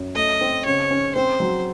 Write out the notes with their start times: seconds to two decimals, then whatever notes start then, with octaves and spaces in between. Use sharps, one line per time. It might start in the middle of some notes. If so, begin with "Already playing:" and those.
Already playing: F#2
0.15 A3 D#5
0.41 C4
0.65 C#3 C#5
0.91 C#4
1.15 C4 C5
1.40 F#3